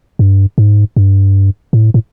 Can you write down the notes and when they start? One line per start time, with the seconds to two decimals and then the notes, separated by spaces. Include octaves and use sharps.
0.19 G2
0.58 G#2
0.97 G2
1.73 A2
1.94 A2